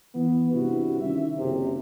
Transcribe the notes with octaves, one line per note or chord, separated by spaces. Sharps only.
E3 B3
G2 C3 E4 F#4
D#3 C#4 E5
F#1 C3